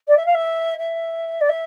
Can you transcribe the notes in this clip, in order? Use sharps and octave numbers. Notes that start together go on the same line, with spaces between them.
D5
E5
F5
E5
E5
D5
E5